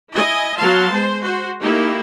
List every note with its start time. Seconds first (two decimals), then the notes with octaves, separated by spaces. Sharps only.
0.14 E4 D#5 G#5
0.56 F#3 B3 F5 A5 C6
0.91 G#3 C5
1.23 F#4 C5
1.61 A3 A#3 D#4 E4 G4